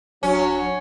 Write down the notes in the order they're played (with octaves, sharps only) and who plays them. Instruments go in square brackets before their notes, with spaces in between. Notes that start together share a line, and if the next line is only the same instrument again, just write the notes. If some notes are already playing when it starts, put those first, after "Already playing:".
[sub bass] D1 [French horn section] F#3 [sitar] C#4 [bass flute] D4